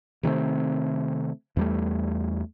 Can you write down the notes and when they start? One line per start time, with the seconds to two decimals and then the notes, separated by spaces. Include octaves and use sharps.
0.23 C3 D#3 A3 C4
1.57 E2 G3 A3